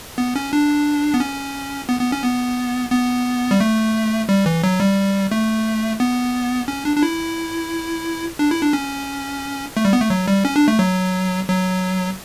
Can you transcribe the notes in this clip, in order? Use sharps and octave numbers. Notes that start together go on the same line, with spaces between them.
B3
C#4
D4
B3
C#4
B3
B3
C#4
B3
B3
G3
A3
G3
E3
F#3
G3
A3
B3
C#4
D4
D4
E4
D4
E4
D4
C#4
A3
G3
B3
A3
F#3
G3
C#4
D4
A3
F#3
F#3